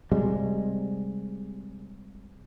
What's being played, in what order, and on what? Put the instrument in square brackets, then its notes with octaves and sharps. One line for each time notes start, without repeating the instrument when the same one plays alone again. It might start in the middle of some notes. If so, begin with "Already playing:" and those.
[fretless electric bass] C3 G3 G#3